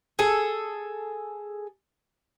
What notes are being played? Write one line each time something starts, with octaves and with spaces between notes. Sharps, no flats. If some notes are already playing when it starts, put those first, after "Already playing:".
G#4 A4